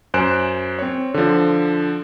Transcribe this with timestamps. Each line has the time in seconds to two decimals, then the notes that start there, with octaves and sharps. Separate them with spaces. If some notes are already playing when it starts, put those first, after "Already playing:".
0.14 F#2 C5 G#5 F#6 D7 E7
0.79 C4 C#5
1.14 D3 F3